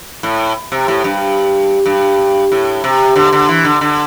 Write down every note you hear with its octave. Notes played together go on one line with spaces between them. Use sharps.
A2
C3
A2
G2
G2
A2
C3
D3
D3
E3
D3
D3